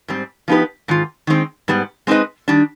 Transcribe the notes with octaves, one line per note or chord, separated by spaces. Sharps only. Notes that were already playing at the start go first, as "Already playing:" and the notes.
G#2 G3 C4
F3 B3 D#4 G4 B4
G#2 D#3 F4
D#3 G#3 C4
G#2 G3 B3
G#3 C4 D#4 B4 D#5
D#3 G3 D4